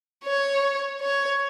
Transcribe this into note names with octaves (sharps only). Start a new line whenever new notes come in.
C#5
C#5